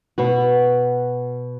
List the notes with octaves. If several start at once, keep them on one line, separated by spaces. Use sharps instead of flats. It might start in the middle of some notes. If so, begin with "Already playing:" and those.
B2 B3 F#4